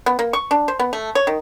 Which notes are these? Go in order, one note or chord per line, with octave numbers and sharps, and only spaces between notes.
B3
A#3
C#6
D4
C5
B3
A3
C#5
D#3